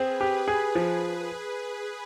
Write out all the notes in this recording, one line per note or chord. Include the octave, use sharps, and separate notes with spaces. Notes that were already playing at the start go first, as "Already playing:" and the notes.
Already playing: C4 G#4 B4
G4
G#4
F3